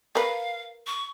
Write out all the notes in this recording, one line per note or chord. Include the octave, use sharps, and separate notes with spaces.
A#4 B4 F5
C#6